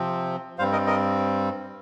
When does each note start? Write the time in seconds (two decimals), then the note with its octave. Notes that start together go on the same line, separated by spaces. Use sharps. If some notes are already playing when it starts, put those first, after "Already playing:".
Already playing: C3 F3 C4
0.59 G2 G3 C4 C5 F5
0.73 A#4 D#5
0.87 A#4 D#5